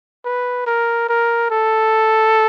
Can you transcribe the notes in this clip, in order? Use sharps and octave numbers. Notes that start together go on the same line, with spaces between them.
B4
A#4
A#4
A4